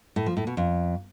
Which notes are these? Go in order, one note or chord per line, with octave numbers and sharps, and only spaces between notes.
A2
F3
A2
B2
F2